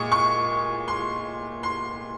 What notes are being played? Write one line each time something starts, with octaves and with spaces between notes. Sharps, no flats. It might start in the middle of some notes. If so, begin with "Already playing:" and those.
Already playing: A#2 G#3 C#6 D#6
C#6
C6
C6